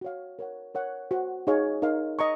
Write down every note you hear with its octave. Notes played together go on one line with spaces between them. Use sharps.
F#4 C#5 F5
A#4 C#5 F#5
A#4 C#5 F#5
F#4 C5 F#5
D#4 G#4 C#5 F5
D#4 A#4 F5
D#5 A#5 C#6